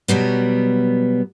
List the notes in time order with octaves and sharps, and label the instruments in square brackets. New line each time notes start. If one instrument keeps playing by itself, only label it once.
[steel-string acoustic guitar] B2 F#3 G3 B3